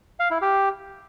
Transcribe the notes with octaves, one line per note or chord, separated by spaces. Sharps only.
F5
E4
G4